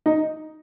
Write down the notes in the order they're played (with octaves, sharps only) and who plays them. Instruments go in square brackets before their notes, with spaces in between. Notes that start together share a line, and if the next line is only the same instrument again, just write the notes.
[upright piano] D#4